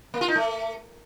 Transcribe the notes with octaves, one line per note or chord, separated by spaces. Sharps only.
A#3
F4
D#4
A3